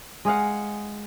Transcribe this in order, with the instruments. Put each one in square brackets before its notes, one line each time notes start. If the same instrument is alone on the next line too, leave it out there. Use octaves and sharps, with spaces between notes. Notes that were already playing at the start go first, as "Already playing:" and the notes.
[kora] G#3 G#4 F5 F#5